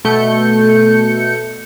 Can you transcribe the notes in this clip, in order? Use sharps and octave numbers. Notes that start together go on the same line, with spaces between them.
B2 A3 G6 C#7